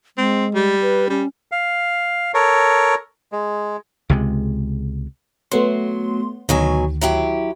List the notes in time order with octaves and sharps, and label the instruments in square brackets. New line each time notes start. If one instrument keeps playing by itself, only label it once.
[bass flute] G#3 [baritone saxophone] C4
[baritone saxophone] G3
[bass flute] B4
[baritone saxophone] G3 [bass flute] C#4
[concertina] F5
A4 A#4 C#5
G#3
[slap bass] C#2 C3 G#3
[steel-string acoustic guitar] F#3 [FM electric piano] A3 B3 C6
[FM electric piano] D2 D#3 [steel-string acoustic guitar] B2 F#3 G#5
[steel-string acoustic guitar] F#3 E4 G4